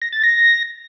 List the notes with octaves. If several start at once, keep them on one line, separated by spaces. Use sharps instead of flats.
A#6
A6
A#6